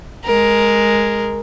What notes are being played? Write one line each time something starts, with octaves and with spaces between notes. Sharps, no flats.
G#3 A#4